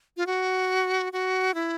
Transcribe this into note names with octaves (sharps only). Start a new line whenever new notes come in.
F4
F#4
F#4
E4